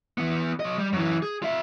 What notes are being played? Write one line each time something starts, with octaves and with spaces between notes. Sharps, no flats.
E3 B3
F#3 D#5
G3
F#2 E3
G#4
F4 E5